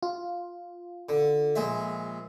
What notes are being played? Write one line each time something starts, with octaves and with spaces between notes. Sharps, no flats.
F4
D3
A#1 G#3 E5